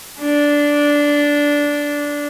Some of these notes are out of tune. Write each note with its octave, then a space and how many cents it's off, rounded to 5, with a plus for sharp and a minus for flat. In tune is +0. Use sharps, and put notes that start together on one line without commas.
D4 -10